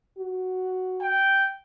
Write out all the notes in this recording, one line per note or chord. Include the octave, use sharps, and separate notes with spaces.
F#4
G5